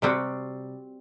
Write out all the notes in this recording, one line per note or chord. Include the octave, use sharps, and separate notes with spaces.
C3 G3 C4 F#4